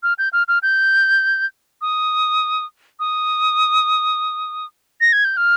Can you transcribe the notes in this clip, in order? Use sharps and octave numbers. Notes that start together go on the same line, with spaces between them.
F6
G6
F6
F6
G6
D#6
D#6
A#6
G#6
G6
F6